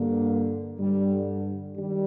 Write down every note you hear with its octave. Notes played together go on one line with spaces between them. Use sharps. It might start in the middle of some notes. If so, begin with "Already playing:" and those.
Already playing: G2 D3 A#3
G2 D3 G3
D#3 G3